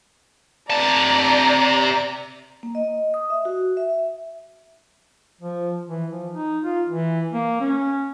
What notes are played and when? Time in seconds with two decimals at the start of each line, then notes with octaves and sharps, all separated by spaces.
0.70 C3 D5 A5 A#5
2.63 A#3
2.75 D#5
3.14 D#6
3.30 E5
3.45 F#4
3.77 E5
5.41 F3
5.88 E3
6.11 F3
6.31 D#4
6.64 F4
6.89 E3
7.33 A#3
7.61 C#4